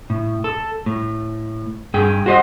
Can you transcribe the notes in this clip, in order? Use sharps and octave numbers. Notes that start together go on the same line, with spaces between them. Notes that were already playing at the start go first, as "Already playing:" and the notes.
A2
A4
A2
G2 G#4 G5
F#4 G4 C5 D#5